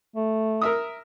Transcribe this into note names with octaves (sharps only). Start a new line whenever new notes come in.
A3
A#4 E5 D#6